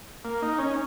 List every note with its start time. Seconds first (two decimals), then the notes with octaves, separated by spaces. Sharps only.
0.25 A#3
0.42 D#4
0.59 C#4